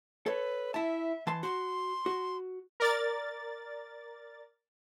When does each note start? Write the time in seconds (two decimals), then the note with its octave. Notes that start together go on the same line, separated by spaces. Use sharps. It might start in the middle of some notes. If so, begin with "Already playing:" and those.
0.26 A4 B4 C#5
0.74 E4 E5 A5
1.27 E3 A5 C6
1.43 F#4 C6
2.06 F#4
2.80 A#4 D5 A6